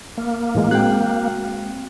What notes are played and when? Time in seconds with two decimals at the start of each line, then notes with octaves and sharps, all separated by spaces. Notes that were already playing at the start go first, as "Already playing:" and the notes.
0.17 A#3
0.55 A2 E3 G#3
0.71 G#3 C4 F#4 G5 F#6